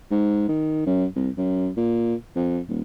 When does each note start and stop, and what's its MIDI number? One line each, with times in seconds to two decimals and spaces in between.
0.11 0.46 44
0.49 0.82 51
0.86 1.05 42
1.16 1.29 36
1.38 1.70 42
1.77 2.14 46
2.36 2.59 41
2.69 2.82 27